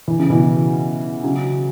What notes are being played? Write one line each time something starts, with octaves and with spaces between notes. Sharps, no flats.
E3
C#3
B2 E3
C#3 F#3